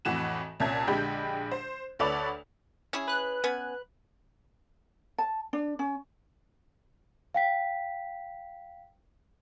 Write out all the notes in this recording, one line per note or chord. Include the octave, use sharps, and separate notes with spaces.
F2 A2 E3 F#4 E7
C2 A#2 C#4 E5 A5 G#6
A#1 D3 G#3 G4 B5 G6
C5
D2 A4 B4 C#5 D5 F7
C#4 E4 G#4
B4 F#6
B3 C#4 G#5
A5
D4
C#4
F5 G5 B6